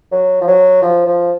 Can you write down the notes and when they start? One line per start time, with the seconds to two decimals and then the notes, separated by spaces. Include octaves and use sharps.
0.12 F#3
0.41 F3
0.48 F#3
0.82 F3
1.06 F3